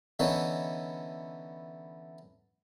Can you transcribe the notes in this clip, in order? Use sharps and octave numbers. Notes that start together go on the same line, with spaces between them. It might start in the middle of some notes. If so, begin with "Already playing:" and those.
D3 E3 B3 C#4 D#4